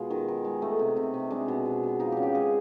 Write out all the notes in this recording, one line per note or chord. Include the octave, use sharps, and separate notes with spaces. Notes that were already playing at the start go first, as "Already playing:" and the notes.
Already playing: B2 G#3 F4
D#3
D#3
G#3
A3 D#4
C3
C3
C3
G#3 D4
B2
B2
B2
F3 D#4
C#3 G4
G4
G#3 G#4